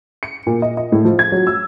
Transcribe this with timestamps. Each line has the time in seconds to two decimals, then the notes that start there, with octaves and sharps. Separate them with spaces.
0.23 C#7
0.47 A#2
0.62 D#5
0.77 D#5
0.92 A2
1.05 F3
1.19 G#6
1.32 F#3
1.47 E6